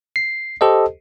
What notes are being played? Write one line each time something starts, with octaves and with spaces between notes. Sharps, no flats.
C7
G4 A4 C5 D#5